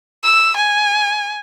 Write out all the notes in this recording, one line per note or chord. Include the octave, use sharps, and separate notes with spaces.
E6
G#5